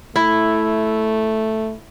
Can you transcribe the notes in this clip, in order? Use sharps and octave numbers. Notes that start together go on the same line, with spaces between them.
A3 E4